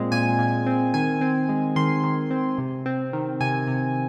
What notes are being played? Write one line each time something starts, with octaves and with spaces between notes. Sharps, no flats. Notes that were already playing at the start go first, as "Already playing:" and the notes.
Already playing: A#2 G#3 C4
A#2 G#5
A#2
C4
D#3 G#5
C4
G#3
D#3 C6
D#3
C4
C3
C4
D#3
C3 G#5
C3